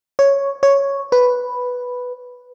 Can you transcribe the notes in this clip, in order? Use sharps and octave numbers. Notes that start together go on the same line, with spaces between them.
C#5
C#5
B4